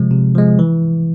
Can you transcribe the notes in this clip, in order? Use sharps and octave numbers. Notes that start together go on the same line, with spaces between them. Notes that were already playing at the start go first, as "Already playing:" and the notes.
Already playing: C3 F3 G#3
C3
F3 G#3
E3